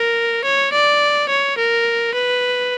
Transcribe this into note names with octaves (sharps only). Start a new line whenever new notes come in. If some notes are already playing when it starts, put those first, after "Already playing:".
Already playing: A#4
C#5
D5
C#5
A#4
B4